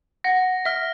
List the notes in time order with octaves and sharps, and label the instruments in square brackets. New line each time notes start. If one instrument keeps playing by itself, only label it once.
[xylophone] F#5 [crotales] A#6
[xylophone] E5 [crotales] F6